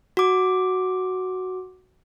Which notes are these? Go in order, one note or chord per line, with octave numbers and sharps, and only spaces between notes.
F#4 D6